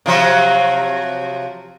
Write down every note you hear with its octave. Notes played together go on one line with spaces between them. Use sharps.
C3 F3 F#3